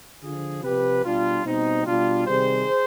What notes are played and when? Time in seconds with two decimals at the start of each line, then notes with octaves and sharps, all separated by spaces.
0.23 D3 F3 F4 G#4
0.64 C3 F3 G4 B4
1.05 B2 G3 D4 F4
1.45 B2 G3 C4 D#4
1.86 B2 G3 D4 F4
2.26 C3 D#3 G3 G#4 C5